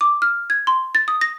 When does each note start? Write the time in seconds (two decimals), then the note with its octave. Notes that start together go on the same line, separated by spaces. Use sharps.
0.01 D6
0.22 F6
0.50 G#6
0.67 C6
0.95 A6
1.08 D#6
1.21 A#6